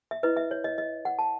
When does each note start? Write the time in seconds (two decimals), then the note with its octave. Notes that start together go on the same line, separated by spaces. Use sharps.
0.11 E5
0.23 E4 B4 D#5
0.37 E5
0.51 C#5
0.64 D#5
0.78 D#5
1.05 F#5
1.19 A5